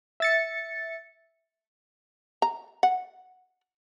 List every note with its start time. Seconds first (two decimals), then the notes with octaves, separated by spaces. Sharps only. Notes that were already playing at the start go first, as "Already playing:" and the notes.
0.20 E5 A6 C#7
2.42 A#5
2.83 F#5